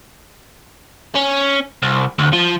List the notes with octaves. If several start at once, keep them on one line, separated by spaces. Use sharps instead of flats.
C#4
C2
D2
F3